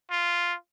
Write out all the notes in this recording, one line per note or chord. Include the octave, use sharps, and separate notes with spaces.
F4